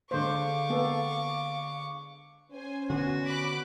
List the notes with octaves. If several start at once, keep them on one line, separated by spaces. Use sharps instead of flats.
D3 G#3 C5 F5 C#6 D6
A#3 B3 A4
C#4 C5 G#5
D3 B3 F#4
B5 D6 F#6